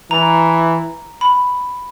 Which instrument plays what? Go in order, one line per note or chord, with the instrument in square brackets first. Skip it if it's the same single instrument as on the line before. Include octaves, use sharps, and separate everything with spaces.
[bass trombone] E3 [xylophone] A#5
[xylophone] B5